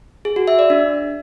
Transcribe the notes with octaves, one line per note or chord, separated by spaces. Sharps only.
G#4
F#4
E5
D5
D4